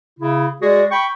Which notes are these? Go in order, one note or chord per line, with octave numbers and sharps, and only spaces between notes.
C#3 E4
G#3 F#4 G#4 D5
G5 B5 C#6